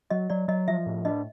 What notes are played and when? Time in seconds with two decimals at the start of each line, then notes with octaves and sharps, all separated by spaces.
0.10 F#3 D#5
0.30 F#3 D5
0.48 F#3 D#5
0.68 F3 E5
0.86 A2
1.05 D4 D#5